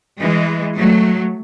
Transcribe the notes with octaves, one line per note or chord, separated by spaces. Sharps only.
E3 G#3
F#3 A3